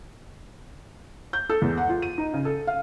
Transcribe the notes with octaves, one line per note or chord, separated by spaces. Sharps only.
G6
A4
E2
F#5
F4
D#7
D#4
C#3
A4
F5